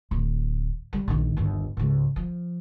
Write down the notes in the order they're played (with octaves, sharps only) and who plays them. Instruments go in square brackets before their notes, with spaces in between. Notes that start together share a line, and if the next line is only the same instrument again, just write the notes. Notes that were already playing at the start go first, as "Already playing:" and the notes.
[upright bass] D1
G3
A#1 D#3
G1 D#2
C#2 G#2
F3